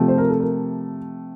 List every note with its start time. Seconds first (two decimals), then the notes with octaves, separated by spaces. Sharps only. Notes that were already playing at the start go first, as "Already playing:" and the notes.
Already playing: C3 F3 A3
0.08 C5
0.18 A#4
0.30 A4
0.40 A#4